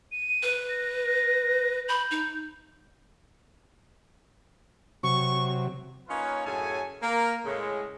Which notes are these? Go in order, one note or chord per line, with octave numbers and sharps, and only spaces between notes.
D#7
B4
A#6
B5 G6
D#4
C3 F#3 C#6
A#3 C#4 D#4 F4 B4 C#5
F#2 A2 C#3 A4 G#5
A#3 A#4
A2 C#3 G#3